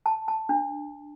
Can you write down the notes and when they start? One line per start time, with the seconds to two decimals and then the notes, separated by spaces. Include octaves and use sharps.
0.06 A5
0.28 A5
0.49 D4